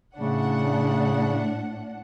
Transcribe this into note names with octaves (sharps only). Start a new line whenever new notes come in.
A2 C#3 D4 F#5